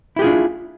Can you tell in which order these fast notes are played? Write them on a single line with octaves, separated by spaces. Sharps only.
E4 G4 G#4 F4 D4